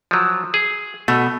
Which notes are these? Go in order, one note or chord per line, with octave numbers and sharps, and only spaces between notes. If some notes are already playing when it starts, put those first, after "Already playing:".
F3 F#3
G#4
B2 A3